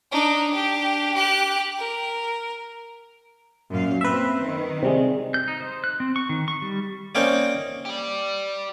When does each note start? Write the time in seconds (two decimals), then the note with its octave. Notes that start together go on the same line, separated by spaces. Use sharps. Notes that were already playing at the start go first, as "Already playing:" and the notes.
0.11 D4 D#4
0.50 D4 G4
1.14 G4 F#6
1.78 A#4
3.70 F#2 A#2 F5
4.01 A#3 C4 B4 E5
4.42 D#3
4.83 C3 G3 G#3
5.34 G6
5.48 D#4
5.61 C5
5.84 F#6
6.00 C4
6.16 C#6
6.29 D#3
6.48 C#6
6.62 G3
7.15 A#3 C4 C#4 D#4 D5 G5
7.85 G4 D5